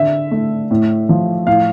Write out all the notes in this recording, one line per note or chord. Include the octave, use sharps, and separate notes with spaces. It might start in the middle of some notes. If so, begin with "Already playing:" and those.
Already playing: D3 E5
A3
A2
F3
A2 F5